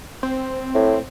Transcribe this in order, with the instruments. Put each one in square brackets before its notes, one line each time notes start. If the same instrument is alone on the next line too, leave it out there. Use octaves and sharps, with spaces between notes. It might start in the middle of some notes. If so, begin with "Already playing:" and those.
[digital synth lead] C4
[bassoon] A2